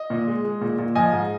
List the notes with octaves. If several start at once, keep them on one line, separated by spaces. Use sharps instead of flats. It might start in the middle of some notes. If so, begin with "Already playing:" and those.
Already playing: D#5
A#2
G#3
G#3
A#2
A#2
F3 D#5 G#5
G#2